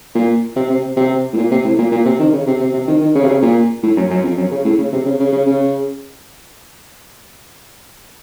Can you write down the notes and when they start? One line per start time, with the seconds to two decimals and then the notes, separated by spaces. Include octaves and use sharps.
0.15 A#2
0.56 C3
0.69 C3
0.97 C3
1.33 A2
1.37 A#2
1.51 C3
1.65 A2
1.78 A#2
1.92 A#2
2.06 C3
2.19 D#3
2.33 C#3
2.47 C3
2.60 C3
2.74 C3
2.88 D#3
3.01 D#3
3.15 C#3
3.23 C3
3.28 C#3
3.42 A#2
3.83 A2
3.97 F#2
4.10 F#2
4.24 F2
4.37 F#2
4.51 C#3
4.65 A2
4.78 C#3
4.92 C3
5.06 C#3
5.20 C#3
5.32 C#3
5.47 C#3